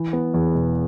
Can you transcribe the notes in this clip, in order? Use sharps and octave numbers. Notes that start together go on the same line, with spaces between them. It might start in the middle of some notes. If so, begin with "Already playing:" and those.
Already playing: E3
B3
E2
E1